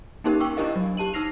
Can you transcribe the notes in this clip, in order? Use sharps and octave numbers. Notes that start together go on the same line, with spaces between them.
A#3 C#4 D#4 G4 A#4
G5 C#6 D6 E6
D4 E4 G4 A#4 D#5 F5
F#3
G4 A5 D#7 F#7
D#4 E6 F6 A#6 C7 F7